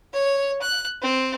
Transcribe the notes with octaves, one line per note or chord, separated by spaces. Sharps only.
C#5
F#6
C4